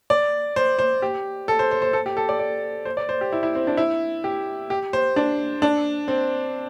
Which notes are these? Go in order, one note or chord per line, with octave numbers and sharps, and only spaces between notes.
D5
C5
C5
G4
A4
C5
C5
C5
A4
G4
A4
D5
D5
C5
D5
C5
G4
E4
E4
C4
D4
E4
G4
G4
C5
D4
D4
C4